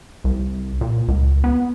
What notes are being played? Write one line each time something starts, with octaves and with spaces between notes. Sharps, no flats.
C2
A#2
C#2
B3